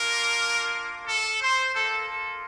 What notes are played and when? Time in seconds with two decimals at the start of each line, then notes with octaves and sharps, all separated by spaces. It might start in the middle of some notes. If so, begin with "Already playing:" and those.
Already playing: A#3 D4 F4 A#4
1.07 A4
1.42 C5
1.74 A#3 F4 A4
2.09 A4